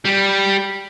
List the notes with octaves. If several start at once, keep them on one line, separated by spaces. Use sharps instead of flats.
G3